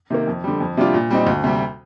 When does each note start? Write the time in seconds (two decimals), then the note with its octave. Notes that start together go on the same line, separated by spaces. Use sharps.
0.10 C3 D#3 A#3
0.27 F2
0.44 D3 G3
0.60 F2
0.77 C3 G3 D4 F4
0.94 A#2
1.10 G3 C4 D#4
1.27 D2
1.44 C3 G3